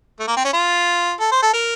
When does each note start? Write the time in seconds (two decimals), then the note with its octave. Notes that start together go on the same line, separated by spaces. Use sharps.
0.20 A3
0.28 A#3
0.37 C4
0.45 C#4
0.53 F4
1.20 A4
1.32 C5
1.42 A4
1.54 A#4